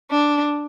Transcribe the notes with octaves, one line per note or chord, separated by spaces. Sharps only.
D4